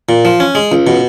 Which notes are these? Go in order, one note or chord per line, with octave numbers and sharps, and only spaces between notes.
A#2
F3
C#4
G#3
C#2
B2